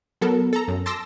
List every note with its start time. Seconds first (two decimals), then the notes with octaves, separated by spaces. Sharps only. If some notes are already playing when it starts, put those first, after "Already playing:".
0.21 F#3 B3 A4 A#4
0.53 A4 A#5
0.68 F#2
0.86 A5 C6 D6 E6 A#6